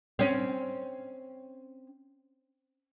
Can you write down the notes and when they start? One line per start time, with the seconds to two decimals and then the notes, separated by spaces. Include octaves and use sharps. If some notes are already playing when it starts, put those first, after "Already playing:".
0.19 C4 C#4